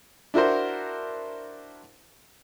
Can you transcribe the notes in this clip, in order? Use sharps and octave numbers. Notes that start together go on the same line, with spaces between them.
D4 E4 F#4 A#4 C5